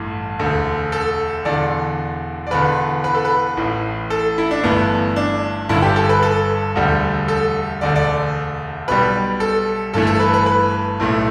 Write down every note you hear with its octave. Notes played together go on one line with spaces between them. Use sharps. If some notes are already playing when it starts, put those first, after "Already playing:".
Already playing: A1 G2 E3 A3
E1 D2 D3
A4
E1 E2 D3 D5
D5
E1 E2 D3 B4
B4
A4
B4
A1 A2 E3
A4
E4
D4
G1 G2 E3 A3 B3
D4
G1 G2 D3 E4
G4
A4
B4
A4
E1 D2 D3 G3
A4
E1 D2 D3 D5
D5
B1 B2 G3 B4
A4
G1 G2 E3 A3 A4
A4
B4
B4
B4
B1 A2 A3